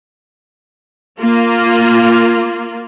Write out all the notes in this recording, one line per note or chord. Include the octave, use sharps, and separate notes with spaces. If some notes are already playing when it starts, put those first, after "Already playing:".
A#3 F4